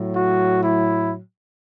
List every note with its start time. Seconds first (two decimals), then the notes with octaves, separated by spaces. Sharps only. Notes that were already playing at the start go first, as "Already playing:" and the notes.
Already playing: A2 F#3
0.14 F#4
0.61 E4